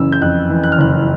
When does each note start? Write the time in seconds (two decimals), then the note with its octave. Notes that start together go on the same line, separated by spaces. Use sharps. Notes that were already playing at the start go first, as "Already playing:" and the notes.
Already playing: F#1 C#3 E3 E6
0.12 G6
0.21 F2 F#6
0.50 E3
0.64 F#6
0.72 F6
0.78 F#1 F#6